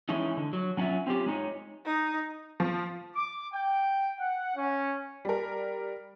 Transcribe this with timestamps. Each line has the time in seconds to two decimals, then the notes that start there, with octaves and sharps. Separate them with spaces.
0.09 E3 G#3 C#4 D#4 E4
0.37 D3
0.53 F#3
0.77 F#3 C#4 D4 F4 E5
1.07 C4 C#4 F4 G4
1.26 G#3 D#4 C#5
1.86 D#4
2.60 F3
3.15 D6
3.52 G5
4.19 F#5
4.56 C#4
5.25 G3 A#4